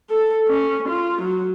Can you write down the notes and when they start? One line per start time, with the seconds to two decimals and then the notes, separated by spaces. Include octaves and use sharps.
0.10 A4
0.48 C#4
0.88 F4
1.22 F#3